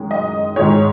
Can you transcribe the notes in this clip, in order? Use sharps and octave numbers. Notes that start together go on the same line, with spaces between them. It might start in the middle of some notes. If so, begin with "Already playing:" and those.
Already playing: F#2 D#3 G#3
D#5
G#2 D#3 G#3 C#5